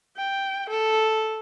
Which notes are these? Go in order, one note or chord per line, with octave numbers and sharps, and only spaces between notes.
G5
A4